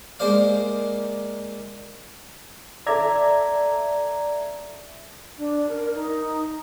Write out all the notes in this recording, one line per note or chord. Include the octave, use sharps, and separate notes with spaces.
G#3 A#3 A#4 C5 D5 F5
A4 D5 E5 A#5 G#6
D4
A#4
D#4